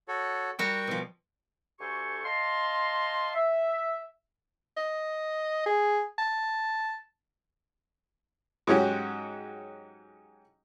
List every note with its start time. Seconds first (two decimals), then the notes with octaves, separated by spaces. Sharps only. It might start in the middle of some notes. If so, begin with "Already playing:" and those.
0.08 F#4 A4 C#5
0.59 G3 F#4 A#4 G5 C#6
0.87 B2 F3
1.80 D2 G4 A4 C5 G#5 C#6
2.24 D#5 F5 A5 A#5 C6
3.34 E5
4.77 D#5
5.66 G#4
6.18 A5
8.67 G#2 F#3 G#3 C#4 F#4 G4